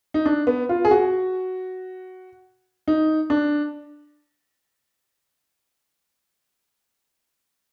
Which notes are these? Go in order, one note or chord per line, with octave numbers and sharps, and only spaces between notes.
D#4
D4
B3
F4
G#4
F#4
D#4
D4